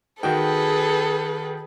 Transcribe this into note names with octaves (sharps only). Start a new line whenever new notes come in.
D#3 F#4 G#4 A4 B4 G5